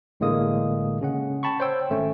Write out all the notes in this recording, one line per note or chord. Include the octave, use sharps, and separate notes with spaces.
A1 A2 D3 G#3 A#3 D#6
C#3 C#4 F#5
G5 A5 B5 C#6
C5 C#5 G5 E6
G#1 A3 C#4